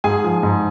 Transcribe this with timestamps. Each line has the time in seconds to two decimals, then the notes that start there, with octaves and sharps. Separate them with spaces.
0.04 G#2 G#4 G#5
0.24 F3
0.43 G#2